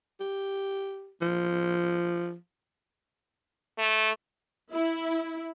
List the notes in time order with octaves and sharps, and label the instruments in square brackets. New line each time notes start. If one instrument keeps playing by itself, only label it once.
[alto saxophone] G4
F3
[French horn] A3
[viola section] E4